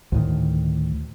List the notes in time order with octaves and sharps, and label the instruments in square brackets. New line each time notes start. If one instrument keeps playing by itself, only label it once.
[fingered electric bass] D2 A2 D#3